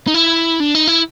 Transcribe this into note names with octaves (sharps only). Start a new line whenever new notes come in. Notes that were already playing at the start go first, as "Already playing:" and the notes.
D#4
E4
D4
D#4
E4